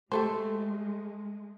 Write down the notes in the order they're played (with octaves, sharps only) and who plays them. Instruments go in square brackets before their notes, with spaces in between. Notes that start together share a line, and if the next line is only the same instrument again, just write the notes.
[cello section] G#3 [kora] A3 [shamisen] G4 A4 C5